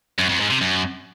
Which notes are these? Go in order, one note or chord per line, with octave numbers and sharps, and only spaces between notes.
F#2
F2
G#2
C3
F#2